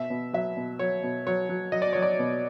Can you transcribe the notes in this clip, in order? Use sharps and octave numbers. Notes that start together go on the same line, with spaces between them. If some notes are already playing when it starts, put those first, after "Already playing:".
Already playing: B2 E5
B2
F#3 E5
B2
F#3 C#5
B2
F#3 C#5
F#3
F#3 D#5
D5
F#3 C#5
D5
B2